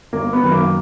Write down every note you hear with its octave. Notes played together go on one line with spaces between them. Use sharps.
G1 A#3
B3
F#2 D#3
A#3